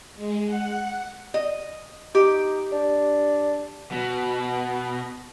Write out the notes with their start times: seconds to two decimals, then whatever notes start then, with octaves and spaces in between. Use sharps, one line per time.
0.15 G#3
0.45 F#5
1.34 D#5
2.15 D#4 G4
2.72 D4
3.92 B2